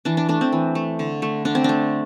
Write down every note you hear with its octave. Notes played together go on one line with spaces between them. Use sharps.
E3 D4
D4
A3 D4
C4
E3
A3
D3
A3
D3 D4
C4
A3 D4